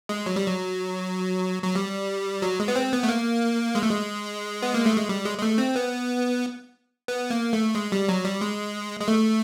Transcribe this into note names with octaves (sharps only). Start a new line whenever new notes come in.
G#3
F#3
G3
F#3
F#3
G3
F#3
G#3
B3
C4
B3
A3
A#3
G#3
A3
G#3
B3
A#3
A3
G#3
G3
G#3
G#3
A3
C4
B3
B3
A#3
A3
G#3
G3
F#3
G3
G#3
G#3
A3